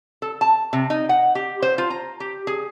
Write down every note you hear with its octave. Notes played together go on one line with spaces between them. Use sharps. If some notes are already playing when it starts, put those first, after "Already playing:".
A4
A5
C3
D#4
F#5
G4
C5
F4
A#5
G4
G#4